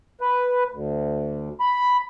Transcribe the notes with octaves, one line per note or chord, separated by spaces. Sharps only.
B4
D2
B5